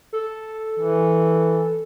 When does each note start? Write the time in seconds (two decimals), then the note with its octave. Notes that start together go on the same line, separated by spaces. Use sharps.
0.13 A4
0.79 E3